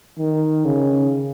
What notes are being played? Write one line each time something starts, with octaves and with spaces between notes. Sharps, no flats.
D#3
C#3